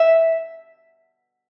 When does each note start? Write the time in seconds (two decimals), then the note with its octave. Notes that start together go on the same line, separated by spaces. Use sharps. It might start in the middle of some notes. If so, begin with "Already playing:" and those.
Already playing: E5